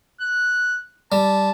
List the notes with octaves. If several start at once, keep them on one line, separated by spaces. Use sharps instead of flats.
F#6
G3 A5